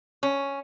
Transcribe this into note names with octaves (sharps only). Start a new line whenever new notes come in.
C#4